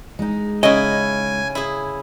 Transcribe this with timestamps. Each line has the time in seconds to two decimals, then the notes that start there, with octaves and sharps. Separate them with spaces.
0.19 G#3 D#4
0.63 C#3 E4 D#5 G#5
1.55 E4 G#4